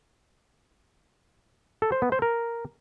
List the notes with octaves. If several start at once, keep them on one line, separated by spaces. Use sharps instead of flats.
A4
C5
B3
C5
A#4